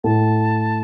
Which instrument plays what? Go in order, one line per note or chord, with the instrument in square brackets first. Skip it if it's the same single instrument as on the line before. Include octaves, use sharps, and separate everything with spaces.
[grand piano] A2 [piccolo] A5